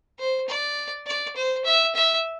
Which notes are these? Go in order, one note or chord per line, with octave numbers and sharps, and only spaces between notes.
C5
D5
D5
C5
E5
E5